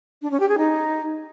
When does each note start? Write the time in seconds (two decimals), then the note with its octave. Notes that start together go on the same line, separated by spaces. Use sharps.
0.22 D4
0.31 C#4
0.40 G4
0.49 G#4
0.58 D#4